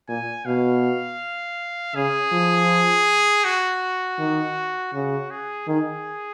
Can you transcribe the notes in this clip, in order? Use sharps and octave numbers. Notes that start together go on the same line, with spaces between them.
A#2 G#5
B2 F5
C#3 G#4
F3
F#4
D#3
C#3 F#4
G#4
D#3 G#4